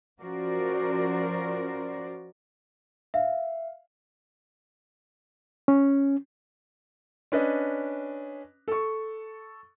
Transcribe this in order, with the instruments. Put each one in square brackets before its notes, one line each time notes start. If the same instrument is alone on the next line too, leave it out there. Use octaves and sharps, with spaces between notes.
[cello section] F3 C#4 F#4 A#4 C5 D5
[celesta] E5 [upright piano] F5
[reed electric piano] C#4
[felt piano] C#4 D4 B4 D#5
A4 C#6